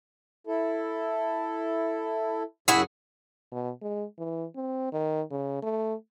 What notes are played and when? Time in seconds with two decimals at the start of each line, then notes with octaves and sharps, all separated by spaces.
0.47 E4 A4
2.68 F#2 C#3 E4 F#4 G#4
3.52 B2
3.82 G#3
4.18 E3
4.55 C4
4.93 D#3
5.30 C#3
5.62 A3